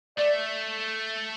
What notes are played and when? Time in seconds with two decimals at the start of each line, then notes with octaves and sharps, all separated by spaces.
0.18 A3 D5